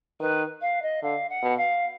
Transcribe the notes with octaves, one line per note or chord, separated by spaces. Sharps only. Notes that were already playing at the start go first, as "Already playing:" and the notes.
D#3 B4
F5
D#5
D3 F5
F#5
B2
F5